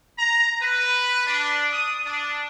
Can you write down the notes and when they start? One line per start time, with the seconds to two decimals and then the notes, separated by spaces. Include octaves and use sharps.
0.18 A#5
0.61 B4
1.26 D4
1.72 D#6
2.06 D4